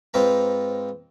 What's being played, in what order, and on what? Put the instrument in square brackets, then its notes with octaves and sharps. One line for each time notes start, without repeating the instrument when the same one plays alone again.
[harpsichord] G#2 C4 F4 B4 A#5